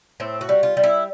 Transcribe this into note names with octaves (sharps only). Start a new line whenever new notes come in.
A2 C4
F#4
G3
F4
G3
E4